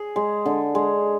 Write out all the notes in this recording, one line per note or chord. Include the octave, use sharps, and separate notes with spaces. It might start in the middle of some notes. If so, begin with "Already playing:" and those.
Already playing: G#4
G#3
D3
G#3